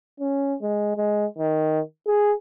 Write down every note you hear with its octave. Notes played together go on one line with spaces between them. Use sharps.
C#4
G#3
G#3
D#3
G#4